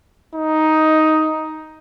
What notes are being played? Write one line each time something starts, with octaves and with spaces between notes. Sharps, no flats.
D#4